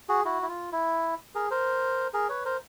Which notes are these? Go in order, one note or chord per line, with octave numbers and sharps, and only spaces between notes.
F#4 G#4
E4 F#4
E4
F4
E4
G#4 A#4
A#4 C5
G#4 A#4
B4 C#5
A#4 C5